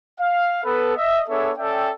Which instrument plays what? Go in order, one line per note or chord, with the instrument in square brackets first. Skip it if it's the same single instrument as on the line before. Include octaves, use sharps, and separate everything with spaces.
[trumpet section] F5
B3 A4 B4
D#5 E5
B3 D4 G#4 A4 C#5 E5
C#4 A4 D5 E5 G5